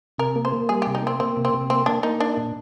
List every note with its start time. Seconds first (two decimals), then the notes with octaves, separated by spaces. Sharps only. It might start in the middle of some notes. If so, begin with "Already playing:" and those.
0.18 C3 A#4
0.36 A#3
0.45 C5
0.52 A#3
0.69 G3 G#4
0.82 C3 G4
0.95 D#4
1.02 A#3 C4
1.20 A#3 C4
1.37 C3
1.45 C4
1.54 C3
1.70 A#3 C4
1.86 A#3 D4
2.03 A#3 D#4
2.20 D4 D#4
2.37 A#2